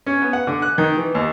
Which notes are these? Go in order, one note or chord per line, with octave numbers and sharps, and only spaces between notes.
C#4
B3
F#5
D3
F#6
D#3
E3
D#2